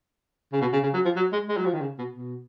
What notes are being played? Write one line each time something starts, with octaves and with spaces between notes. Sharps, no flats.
C#3
B2
C#3
C#3
F#3
F3
F#3
G#3
G#3
F#3
F3
D#3
C#3
B2
B2